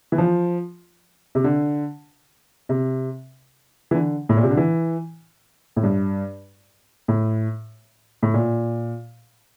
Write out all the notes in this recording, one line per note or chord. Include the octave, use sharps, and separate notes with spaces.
E3
F3
C3
D3
C3
E3
D3
A2
A#2
C3
D3
E3
A2
G2
A2
A2
A#2